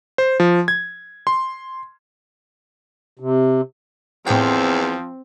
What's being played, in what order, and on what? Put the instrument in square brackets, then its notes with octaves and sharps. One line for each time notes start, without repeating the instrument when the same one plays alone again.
[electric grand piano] C5
F3
G#6
C6
[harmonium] C3
[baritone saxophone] E2 [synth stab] A2 G5 [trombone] F3 [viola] C4